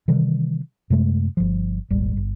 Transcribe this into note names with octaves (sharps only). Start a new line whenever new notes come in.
C3 D#3 E3 G3
F#2 C3 G#3 A3
G1 F3
D#1 G#1 G3
G1